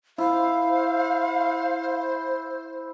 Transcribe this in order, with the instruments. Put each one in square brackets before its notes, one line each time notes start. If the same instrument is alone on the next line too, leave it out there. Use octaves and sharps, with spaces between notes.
[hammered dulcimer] E4 [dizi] C5 [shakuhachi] F5